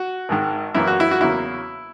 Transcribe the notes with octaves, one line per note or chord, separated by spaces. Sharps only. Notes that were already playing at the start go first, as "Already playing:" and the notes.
Already playing: F#4
G#1 G#2 D#3
F#2 E3 A#3 E4
F#4
E4
F#4
E2 C#3 F#3 A#3 E4